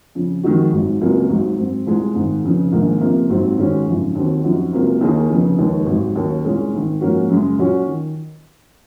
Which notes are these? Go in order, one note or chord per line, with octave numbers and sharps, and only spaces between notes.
F2 C#3 F3
F2 D#3 G#3 D#4 F#4
G#1 G#2 F#3
C#2 C3 F#3 A#3
G#1 G#2 F#3
G#2 F#3 C4
C2 A#2 G#3 C4 F4
G#1 G#2 D#3
F1 F2 C#3
A#1 G#2 D#3 A#3 D#4
C#2 C3 F3 A#3
G#1 G#2 F#3 C4 F4
G#2 D#3 G#3 C#4 F#4
G#1 F#2 C#3 F3
D#2 D#3 F#3 C4 F#4
F#2 F3 C4 D#4 F#4
C#2 C3 F#3 A#3
D#2 D#3 A#3 D#4 G#4
F1 F2 C#3
F1 D#2 D#3 G#3
G#1 G#2 F#3
D#2 D#3 F#3 A#3 C#4
C2 A#2 G#3 C#4 G#4
G#1 G#2 D#3
G#2 F3 A#3 C#4 F#4
F#2 C#3 G#3
A#2 F#3 C#4 F#4
D#3